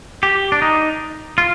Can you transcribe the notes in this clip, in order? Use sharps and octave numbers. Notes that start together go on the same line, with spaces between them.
G4
D4
D#4
F4